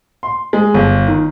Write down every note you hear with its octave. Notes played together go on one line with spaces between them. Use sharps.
C6
G#3
G1
D#3